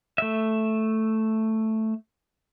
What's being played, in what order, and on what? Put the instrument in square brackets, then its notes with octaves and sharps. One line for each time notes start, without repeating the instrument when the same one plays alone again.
[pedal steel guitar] A3 E5